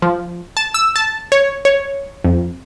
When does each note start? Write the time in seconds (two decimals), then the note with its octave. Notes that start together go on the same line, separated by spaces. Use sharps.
0.02 F3
0.57 A5
0.74 E6
0.96 A5
1.32 C#5
1.65 C#5
2.24 F2